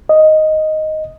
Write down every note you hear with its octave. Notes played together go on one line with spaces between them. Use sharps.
D#5